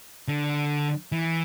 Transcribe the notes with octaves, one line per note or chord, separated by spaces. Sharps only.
D3
E3